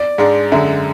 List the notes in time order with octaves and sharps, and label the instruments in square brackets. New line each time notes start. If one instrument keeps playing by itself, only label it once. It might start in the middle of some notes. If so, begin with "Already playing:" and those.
Already playing: [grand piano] D5
[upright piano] G#2 G#3 D4
[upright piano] F#2 D3 G#3 [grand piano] E5